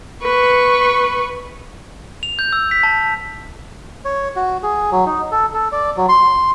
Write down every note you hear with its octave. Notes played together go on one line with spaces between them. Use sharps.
B4 C#6
F7
G6
E6
B6
A5
C#5
F#4
G#4
F#3
D#4
A4
A4
D5
F#3
C6